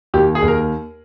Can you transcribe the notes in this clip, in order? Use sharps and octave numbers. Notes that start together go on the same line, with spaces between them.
D#2 G4
G#4
D#2
A#4